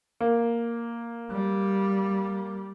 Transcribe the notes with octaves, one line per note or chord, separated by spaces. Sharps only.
A#3
G3